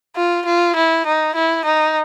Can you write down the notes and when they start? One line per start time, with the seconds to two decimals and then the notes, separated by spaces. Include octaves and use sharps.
0.16 F4
0.46 F4
0.76 E4
1.06 D#4
1.35 E4
1.65 D#4